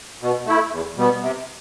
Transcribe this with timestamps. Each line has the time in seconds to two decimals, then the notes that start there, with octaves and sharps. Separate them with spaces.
0.22 B2
0.46 A3 E4
0.72 E2
0.96 B2 G3 B3
1.21 C3